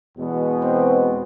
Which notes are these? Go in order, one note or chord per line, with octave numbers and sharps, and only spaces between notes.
E2 B2 G#3 B3
C4